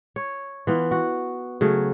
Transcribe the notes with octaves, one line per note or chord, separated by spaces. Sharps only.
C#5
E3 B3 F4
F#4
C#3 F#3 A3